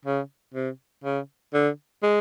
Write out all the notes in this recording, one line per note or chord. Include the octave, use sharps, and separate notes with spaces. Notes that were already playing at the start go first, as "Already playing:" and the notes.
C#3
C3
C#3
D3
G#3